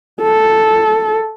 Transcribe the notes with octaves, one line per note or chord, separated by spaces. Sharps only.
A4